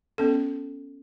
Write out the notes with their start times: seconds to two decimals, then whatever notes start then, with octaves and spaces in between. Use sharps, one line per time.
0.18 B3 C#4 A4